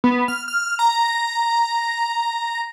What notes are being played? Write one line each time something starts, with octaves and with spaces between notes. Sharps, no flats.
B3
F6
F6
A#5